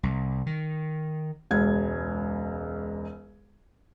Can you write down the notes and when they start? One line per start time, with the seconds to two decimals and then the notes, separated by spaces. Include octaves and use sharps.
0.03 C2
0.46 D#3
1.51 E1 C#2 G#6